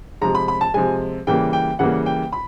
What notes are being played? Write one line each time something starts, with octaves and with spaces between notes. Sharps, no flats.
C3 F3 G#3 A#5
B5
B5
A5
C3 F3 G#3 G#5
C#3 E3 G3 A#3 G5
G5
C#3 E3 G3 A#3 F#5
G5
B5